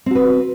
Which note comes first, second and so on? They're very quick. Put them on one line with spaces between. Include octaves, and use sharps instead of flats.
C4 F#4 B4